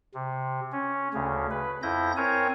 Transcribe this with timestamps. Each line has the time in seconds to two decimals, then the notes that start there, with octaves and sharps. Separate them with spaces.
0.14 C3
0.72 C#4
1.14 D2 C#3
1.51 B4
1.83 F2 E4 G6 A#6
2.17 C4 A#4 C#5 G#5